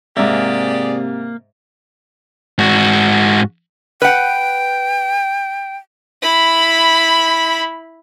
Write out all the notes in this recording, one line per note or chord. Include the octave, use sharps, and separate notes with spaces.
G#2 C3 A#3 G4 G#4 D5 E5
G#2 F#4
B4 F#5 G5
E4 B5